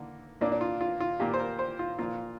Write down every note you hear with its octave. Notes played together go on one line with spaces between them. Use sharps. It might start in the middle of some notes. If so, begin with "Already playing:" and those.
Already playing: D3 A#3
A#2 A#3 D4
D4
F4
F4
F4
A#2 A#3 G4
C5
A#4
C5
F4
A#2 F3 A#3 F4